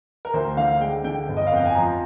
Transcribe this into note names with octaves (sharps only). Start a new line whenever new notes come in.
A#4
D2 C5
D3 F5
G#3 G5
D3 G5
G1
D#5
F5
F2 G5
G#5
F3 A#5